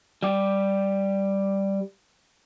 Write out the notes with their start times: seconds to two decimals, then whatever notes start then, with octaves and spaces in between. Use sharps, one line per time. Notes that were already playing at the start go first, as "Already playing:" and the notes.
0.23 G3 G4